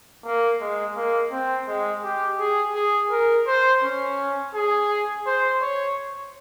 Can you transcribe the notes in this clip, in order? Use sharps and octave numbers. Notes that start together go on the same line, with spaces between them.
A#3
G#3
A#3
C4
G#3
G4
G#4
G#4
A#4
C5
C#4
G#4
C5
C#5